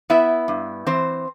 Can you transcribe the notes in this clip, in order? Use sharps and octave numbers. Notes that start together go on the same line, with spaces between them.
B3 E4 E5
G2
E3 C4 C5